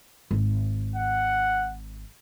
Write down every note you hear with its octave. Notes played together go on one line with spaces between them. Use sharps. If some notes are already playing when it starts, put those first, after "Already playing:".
G#1
F#5